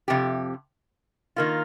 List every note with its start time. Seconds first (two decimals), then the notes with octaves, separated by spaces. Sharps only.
0.08 F2 C3 G4
1.36 D#3 A#3 F4